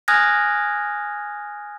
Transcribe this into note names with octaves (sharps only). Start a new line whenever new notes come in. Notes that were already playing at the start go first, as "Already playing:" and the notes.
G#5 D#6 F6 F#6 G#6 A#6